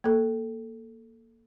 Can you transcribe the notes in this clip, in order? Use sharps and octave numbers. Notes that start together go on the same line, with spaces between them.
A#3 A4